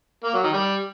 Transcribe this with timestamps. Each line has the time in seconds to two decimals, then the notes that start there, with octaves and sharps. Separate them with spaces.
0.24 A#3
0.34 F#3
0.43 D#3
0.53 G3